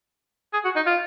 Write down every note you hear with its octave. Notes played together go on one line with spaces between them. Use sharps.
G#4
F#4
D#4
F4